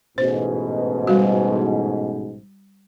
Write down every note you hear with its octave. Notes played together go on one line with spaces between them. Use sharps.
A1 G#2 B2 C5
G3 F#4